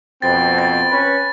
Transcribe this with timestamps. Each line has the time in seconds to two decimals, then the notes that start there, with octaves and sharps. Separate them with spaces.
0.22 F2 B2 C4 B4 A6
0.59 A6
0.91 C#4 B4